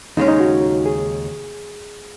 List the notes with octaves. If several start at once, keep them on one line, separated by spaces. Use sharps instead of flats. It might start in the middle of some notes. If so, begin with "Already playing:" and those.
D#2 C#3 G#3 C#4 D#4
D#4
F#4
G#4